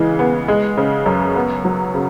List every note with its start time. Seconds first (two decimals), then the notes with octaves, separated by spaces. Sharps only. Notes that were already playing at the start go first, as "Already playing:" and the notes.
Already playing: C#3 E3 G#3
0.19 B3
0.48 G#3
0.77 C#3
1.06 F#2
1.36 B3
1.65 F#3
1.95 C#3